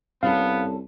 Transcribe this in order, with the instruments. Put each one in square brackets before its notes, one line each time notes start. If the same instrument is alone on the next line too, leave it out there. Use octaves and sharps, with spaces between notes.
[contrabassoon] C2 [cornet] B3 [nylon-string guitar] C#4 A4 [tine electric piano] F5